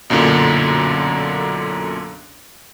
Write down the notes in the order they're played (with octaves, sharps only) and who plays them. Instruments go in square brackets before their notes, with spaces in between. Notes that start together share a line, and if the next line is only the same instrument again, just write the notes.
[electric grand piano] B1 F#2 A#2 D3